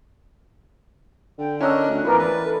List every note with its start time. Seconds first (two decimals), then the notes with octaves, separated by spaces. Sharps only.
1.38 D3 G5
1.61 C#4 D4 A#4 D#5 E6 F#6
1.88 D2
2.04 E2 G#2 E3 F3 D4 A#4 B4
2.19 B4 D5
2.44 A4